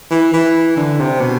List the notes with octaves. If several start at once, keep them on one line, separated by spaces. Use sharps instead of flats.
E3
E3
D3
C3
B2